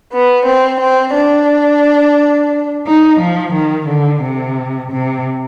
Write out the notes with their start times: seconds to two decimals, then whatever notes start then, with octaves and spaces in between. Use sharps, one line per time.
0.12 B3
0.46 C4
0.80 C4
1.14 D4
2.85 D#4
3.19 F3
3.53 D#3
3.87 D3
4.22 C3
4.90 C3